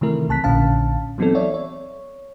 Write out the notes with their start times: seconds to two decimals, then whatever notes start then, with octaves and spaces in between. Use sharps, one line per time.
0.01 C3 D#3 E3 A3 E4 A#4
0.28 C2 C3 A5 F#6 B6
0.44 A#1 A#2 D3 C#4 F5 A5
1.18 E3 F#3 B3 C4 D#4 A4
1.35 C#5 D5 E5
1.54 C#5